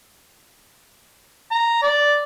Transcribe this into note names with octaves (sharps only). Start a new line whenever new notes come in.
A#5
D5